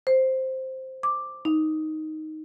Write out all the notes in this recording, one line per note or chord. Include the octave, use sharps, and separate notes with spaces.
C5
D6
D#4